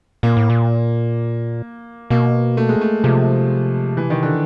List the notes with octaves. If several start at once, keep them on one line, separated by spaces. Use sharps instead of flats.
A#2 A#3
A2
A#2
B2 A#3
A3
G#3
A3
C3 F3
E3
D#3
D3